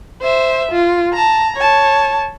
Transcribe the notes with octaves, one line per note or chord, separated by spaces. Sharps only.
C5 E5
F4
A5 A#5
C#5 A5